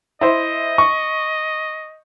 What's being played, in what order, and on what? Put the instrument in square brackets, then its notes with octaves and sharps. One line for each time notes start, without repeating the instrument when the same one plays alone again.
[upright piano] E4 C5 [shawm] D#5
[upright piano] C#6